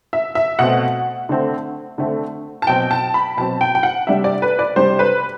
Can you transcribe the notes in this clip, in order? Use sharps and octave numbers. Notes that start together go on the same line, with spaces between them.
E5
E5
B2 A3 C4 F#5
D3 A3 C4
D3 A3 C4
A5
B2 F#3 C4 G5
A5
B5
B2 F#3 C4 A5
G5
G5
F#5
C3 G3 D4 E5
D5
B4
D5
C3 G3 D4 C5
B4